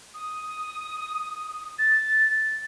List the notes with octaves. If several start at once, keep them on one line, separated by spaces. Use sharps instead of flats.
D#6
A6